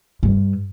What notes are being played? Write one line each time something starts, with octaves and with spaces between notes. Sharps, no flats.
G2